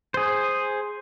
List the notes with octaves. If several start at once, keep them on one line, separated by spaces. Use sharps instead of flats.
G#4 C5